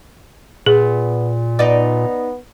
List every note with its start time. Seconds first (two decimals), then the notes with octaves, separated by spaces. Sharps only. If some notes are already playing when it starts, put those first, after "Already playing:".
0.66 A#2 B3 G#4
1.59 B3 D#4 D5